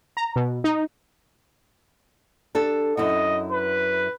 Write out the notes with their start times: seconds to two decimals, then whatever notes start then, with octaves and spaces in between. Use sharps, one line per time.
0.17 A#5
0.36 B2
0.64 D#4
2.55 D4 G4 A4
2.97 F#2 E4 D#5 F#5
3.52 B4